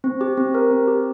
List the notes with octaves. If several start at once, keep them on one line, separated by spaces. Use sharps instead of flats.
C4
G4
C4
A#4
C4
G4